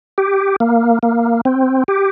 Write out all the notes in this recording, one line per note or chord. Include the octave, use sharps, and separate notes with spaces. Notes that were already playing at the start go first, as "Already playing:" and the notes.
G4
A#3
A#3
C4
G4